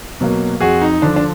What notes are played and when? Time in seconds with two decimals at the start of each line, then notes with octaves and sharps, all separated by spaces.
0.21 B2 F#3 A#3
0.60 F2 F#4 G#4
0.82 D#4
1.02 D3 F3 D4
1.16 D4